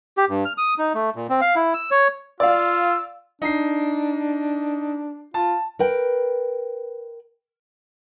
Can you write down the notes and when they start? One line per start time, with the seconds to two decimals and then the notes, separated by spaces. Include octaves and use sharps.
0.18 G4
0.29 G2
0.45 F6
0.58 D#6
0.78 D#4
0.94 A3
1.16 A#2
1.29 C4
1.41 F5
1.56 E4
1.74 E6
1.91 C#5
2.40 F4 D5 F5 E6
3.42 D4 D#4 C7
5.34 F4 A5
5.79 A#4 B4 G5